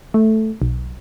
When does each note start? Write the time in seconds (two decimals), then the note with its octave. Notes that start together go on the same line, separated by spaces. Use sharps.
0.14 A3
0.62 B1